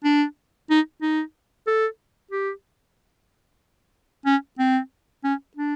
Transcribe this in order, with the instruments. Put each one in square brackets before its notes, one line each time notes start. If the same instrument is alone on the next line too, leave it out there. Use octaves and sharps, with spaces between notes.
[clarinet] D4
D#4
D#4
A4
G4
C#4
C4
C#4
D4